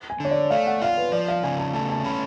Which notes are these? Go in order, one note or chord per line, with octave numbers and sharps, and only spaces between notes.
G#5
D3 C#5
D5
A3 F5
F#5
F4 F5
B4
F3 D5
F5
C#3 G#5
A5
A3 A5
A5
C#4 B5